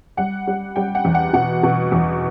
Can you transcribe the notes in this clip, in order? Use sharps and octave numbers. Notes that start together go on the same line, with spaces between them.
G3 F#5
G3
G3 G5
F#5
E2
F#5
B2 F#5
B2
E2